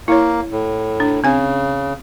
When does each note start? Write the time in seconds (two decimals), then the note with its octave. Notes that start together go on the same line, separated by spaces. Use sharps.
0.08 A#3 E4 C#5
0.52 A2
1.00 D4
1.24 C#3 C4 G#5